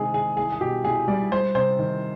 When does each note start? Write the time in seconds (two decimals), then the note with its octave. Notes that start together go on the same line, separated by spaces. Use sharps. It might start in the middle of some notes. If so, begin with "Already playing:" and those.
Already playing: C3 D#3 G#3 G#4
0.13 D#3 G#4
0.37 C2 G#4
0.52 G#4
0.61 B2 G4
0.84 C2 G#4
1.08 G3 D5
1.31 G3 C5
1.55 C3 C5
1.79 D#3